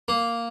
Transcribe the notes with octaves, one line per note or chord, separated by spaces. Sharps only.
A#3